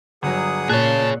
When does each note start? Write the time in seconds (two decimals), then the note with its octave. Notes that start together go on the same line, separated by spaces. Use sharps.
0.23 G1 F#3 G#4 F#5 D#6
0.69 A#2 G#4 C#5 A5 F#6